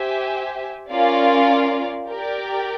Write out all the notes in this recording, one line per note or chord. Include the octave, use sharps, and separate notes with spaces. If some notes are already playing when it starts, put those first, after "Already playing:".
Already playing: G4 C5 E5 G#5
C#4 F4 A#4 D5 F5
G4 A#4 D5 G5